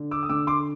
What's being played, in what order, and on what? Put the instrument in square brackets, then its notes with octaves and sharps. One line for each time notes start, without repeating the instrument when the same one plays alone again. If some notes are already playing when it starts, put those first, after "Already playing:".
Already playing: [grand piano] D3
D6 E6
D#6
D3 D6 E6
C6 D6